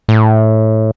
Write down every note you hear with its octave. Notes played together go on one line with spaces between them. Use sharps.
A2